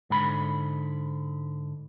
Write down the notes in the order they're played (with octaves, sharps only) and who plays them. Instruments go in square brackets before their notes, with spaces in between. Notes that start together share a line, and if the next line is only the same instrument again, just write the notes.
[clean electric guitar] G#2 D3 B5